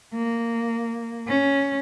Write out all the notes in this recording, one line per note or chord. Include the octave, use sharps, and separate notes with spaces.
A#3
C#4